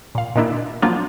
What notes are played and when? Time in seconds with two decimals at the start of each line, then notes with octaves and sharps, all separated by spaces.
0.15 A#2 F5
0.36 A#2 D#3 A#3 D4 E4
0.82 F3 F#3 A#3 C4 D4 F4